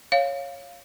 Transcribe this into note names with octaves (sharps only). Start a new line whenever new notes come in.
C#5 F5